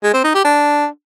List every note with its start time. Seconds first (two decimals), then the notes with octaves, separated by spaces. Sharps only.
0.03 G#3
0.14 C4
0.24 D#4
0.34 G4
0.45 D4